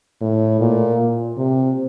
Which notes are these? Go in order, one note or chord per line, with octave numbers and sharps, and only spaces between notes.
A2
A#2
C3